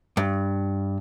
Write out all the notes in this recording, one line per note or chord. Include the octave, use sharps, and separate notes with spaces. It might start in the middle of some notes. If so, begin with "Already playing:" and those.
G2